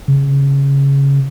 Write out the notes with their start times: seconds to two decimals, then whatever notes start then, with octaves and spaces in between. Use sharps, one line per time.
0.08 C#3